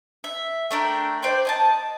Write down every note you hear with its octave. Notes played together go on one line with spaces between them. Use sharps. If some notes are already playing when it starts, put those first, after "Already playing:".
E5
A3 D4 A#4 G5
C5 D5 G5 C6
D#5 G#5 A5